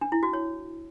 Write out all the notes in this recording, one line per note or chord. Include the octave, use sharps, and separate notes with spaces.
D4
E4
F#4
C#5